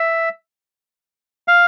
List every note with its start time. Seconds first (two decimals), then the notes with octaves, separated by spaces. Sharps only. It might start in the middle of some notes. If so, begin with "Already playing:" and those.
Already playing: E5
1.48 F5